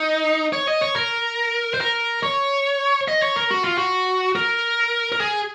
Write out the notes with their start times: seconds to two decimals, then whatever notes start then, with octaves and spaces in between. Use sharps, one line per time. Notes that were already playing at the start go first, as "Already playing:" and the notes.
Already playing: D#4
0.53 C#5
0.67 D#5
0.81 C#5
0.96 A#4
1.74 C5
1.81 A#4
2.23 C#5
3.08 D#5
3.22 C#5
3.36 A#4
3.51 F#4
3.64 F4
3.78 F#4
4.36 A#4
5.12 A#4
5.21 G#4